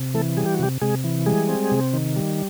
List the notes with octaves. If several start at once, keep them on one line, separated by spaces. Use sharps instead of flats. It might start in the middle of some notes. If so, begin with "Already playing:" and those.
Already playing: C3
E3 A3 A4
G3 G#4
G4
F#4
C3 G3 G4
C3 G#3 G#4
E3
G3 G#3 G#4
C4
C3
D#3
G3